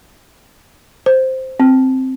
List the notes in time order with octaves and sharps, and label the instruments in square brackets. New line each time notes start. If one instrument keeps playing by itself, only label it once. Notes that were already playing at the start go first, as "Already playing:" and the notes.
[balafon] C5
C4